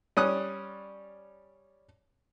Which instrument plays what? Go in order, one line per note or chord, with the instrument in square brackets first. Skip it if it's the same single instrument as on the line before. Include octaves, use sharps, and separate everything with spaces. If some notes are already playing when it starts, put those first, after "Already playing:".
[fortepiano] G3 C#4 D#6 F#6